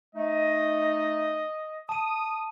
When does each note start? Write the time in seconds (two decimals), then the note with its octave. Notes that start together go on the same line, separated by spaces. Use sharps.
0.15 A3 D#4 D#5
1.89 A5 D#6 D#7